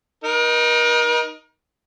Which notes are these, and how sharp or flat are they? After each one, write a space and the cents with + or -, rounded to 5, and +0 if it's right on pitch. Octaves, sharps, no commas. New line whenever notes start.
D#4 +0 A#4 +40